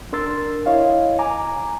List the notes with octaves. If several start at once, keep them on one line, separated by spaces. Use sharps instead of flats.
D4 A#4 C6 E6 A6
E4 C#5 D#5 F5
G#5 A#5 D6